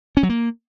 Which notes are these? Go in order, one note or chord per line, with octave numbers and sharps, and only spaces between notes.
C#4
F#3
A#3